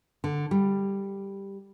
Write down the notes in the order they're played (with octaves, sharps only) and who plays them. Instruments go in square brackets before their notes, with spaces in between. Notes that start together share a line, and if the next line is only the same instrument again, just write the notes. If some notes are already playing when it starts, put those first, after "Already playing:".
[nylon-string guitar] D3
G3